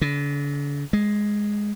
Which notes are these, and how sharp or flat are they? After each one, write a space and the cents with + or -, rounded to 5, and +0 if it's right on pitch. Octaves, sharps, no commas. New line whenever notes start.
D3 -40
G#3 +0